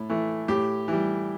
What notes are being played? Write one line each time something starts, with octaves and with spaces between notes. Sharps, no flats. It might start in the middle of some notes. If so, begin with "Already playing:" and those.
Already playing: A2
E3 A3
A2 G4
E3 G3